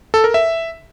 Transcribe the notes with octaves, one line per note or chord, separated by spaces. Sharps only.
A4
A#4
E5